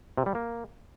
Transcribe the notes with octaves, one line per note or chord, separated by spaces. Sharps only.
C3
G3
A#3